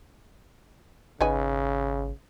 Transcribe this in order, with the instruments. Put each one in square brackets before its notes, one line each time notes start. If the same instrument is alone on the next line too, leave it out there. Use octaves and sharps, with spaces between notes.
[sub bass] G#1 [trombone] C#3 [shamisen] D#4 B4 G#5